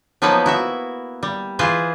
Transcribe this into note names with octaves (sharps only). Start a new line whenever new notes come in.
F3 F#3 A#3 B3 D#4 B4
E4 F#4 E5
G3
E3 F4 G#4 B4 C5